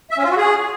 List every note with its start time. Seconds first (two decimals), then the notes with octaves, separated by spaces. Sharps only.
0.11 E5
0.17 C#4
0.24 F4
0.31 F#4
0.37 G#4